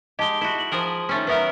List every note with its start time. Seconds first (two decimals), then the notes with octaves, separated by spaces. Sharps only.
0.19 G#3 G4 D#5 A5 G7
0.41 E4 F#4
0.59 F#7
0.72 F3 G#4 A#4
1.09 D#3 A3 C#4
1.27 F#3 B3 A#4 B4 E5